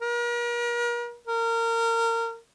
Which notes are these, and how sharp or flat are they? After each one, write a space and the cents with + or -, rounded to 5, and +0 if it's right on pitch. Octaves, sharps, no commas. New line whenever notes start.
A#4 +40
A#4 -25